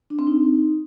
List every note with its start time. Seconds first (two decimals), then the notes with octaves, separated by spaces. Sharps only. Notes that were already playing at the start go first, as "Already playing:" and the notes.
0.10 D4
0.19 C4
0.27 D#4